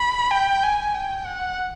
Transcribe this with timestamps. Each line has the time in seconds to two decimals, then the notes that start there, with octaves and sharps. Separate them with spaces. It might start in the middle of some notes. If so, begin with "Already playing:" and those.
Already playing: B5
0.31 G5
0.63 G#5
0.94 G5
1.26 F#5